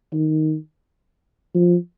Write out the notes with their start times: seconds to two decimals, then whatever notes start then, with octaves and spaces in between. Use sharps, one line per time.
0.13 D#3
1.54 F3